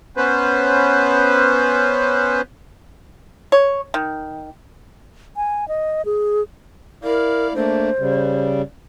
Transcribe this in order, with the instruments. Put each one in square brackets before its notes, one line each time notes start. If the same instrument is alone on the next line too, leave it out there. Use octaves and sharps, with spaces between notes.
[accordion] B3 C#4 B4 C5
[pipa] C#5
D#3
[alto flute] G#5
D#5
G#4
[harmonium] E4 D5 F5 [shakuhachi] A#4
[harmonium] A3 A#3 D4 [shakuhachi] C5
[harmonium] C#3 G3